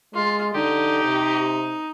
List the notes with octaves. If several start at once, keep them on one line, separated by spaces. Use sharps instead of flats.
G#3 F4
D3 D#4 G4
C3